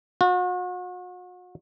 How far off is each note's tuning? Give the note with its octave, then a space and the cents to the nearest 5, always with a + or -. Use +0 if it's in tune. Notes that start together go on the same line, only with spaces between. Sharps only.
F#4 -40